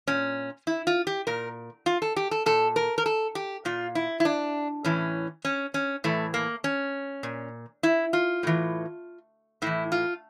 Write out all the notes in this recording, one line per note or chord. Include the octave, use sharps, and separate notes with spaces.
A#2 C#4
E4
F4
G4
A#2 A#4
F4
A4
G4
A4
A#2 A4
A#4
A#4
A4
G4
A#2 F4
E4
E4
D4
A2 E3 C#4
C#4
C#4
A2 E3 A3
A#3
C#4
A#2
E4
F4
A2 E3
A2 E3 E4
F4